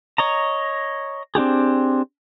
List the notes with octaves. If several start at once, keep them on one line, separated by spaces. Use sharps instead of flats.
C#5 D#5 A#5
C4 D4 G4 G#4